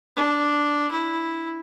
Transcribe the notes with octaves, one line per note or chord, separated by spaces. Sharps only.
D4
E4